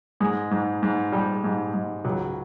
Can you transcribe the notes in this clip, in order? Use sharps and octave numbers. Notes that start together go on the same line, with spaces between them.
G#2 G#3
G#2
G#2
F3 G3
G#2
G#2
C#2 F#3